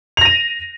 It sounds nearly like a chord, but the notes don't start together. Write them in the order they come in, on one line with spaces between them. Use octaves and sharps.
F7 A#6 D#7